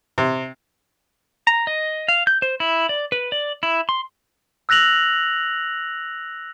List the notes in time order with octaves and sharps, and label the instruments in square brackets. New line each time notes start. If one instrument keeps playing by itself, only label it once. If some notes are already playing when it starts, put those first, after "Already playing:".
[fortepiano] C3
[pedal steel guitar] A#5
D#5
F5
G6
C5
E4
D5
B4
D5
E4
C6
[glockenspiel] E6 F#6 A#6 F7 F#7